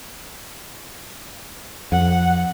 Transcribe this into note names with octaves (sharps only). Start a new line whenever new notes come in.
F2 F#5